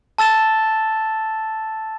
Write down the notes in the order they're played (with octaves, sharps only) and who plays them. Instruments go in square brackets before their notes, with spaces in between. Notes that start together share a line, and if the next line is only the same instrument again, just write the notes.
[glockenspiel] A5 E6 A6 E7 G7